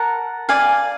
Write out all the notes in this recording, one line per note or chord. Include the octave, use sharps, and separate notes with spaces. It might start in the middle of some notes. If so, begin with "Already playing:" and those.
Already playing: A#4 F#5 A5
D5 F5 G#5